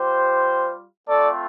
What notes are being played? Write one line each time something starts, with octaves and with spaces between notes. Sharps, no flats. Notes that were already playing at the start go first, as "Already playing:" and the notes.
Already playing: G3 F4 G4 C5
A3 C4 F4 A4 D5